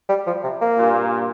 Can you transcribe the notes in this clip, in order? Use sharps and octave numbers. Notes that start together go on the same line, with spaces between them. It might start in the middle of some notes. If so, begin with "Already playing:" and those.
G3
F3
C3
A#3
G2 A#2